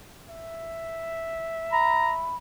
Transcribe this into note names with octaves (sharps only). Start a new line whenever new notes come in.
E5
A#5 B5